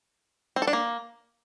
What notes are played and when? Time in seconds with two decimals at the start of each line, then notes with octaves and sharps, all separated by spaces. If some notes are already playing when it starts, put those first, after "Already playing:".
0.56 C4
0.62 A4
0.67 D4
0.73 A#3